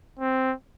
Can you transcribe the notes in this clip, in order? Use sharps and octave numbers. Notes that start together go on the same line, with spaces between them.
C4